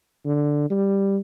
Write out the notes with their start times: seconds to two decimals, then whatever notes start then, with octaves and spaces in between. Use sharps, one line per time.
0.26 D3
0.70 G3